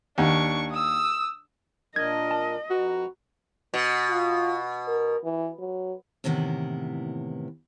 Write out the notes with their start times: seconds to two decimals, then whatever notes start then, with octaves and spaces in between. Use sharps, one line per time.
0.18 D#2 D4 C#6
0.71 D#6 E6
1.96 A#2 D4 A#4 D#5 G#6
2.31 A5
2.70 F2 F#4 B4 A#5
3.74 B2
4.10 F4
4.88 A#4
5.24 E3
5.59 F#3
6.24 A2 C3 D#3 E3 A#3 B3